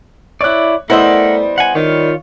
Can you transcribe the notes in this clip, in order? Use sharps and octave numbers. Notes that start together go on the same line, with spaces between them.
E4 C#5 D5 F#6
G3 A3 B3 E4 A#4 C5 D#5 F#5
F#5 G#5
D#3 F4 C#5